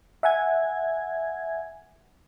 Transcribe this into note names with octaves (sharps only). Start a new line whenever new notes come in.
E5 F#5 G#5 G#6